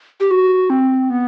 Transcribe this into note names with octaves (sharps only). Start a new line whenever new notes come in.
G4
F#4
C4
B3